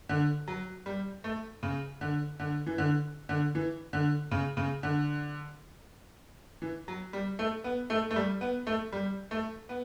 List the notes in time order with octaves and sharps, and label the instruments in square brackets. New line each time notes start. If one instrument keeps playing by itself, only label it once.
[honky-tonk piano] D3
F#3
G3
A3
C#3
D3
D3
E3
D3
D3
E3
D3
C#3
C#3
D3
E3
F#3
G3
A3
B3
A3
A3
G3
B3
A3
G3
A3
B3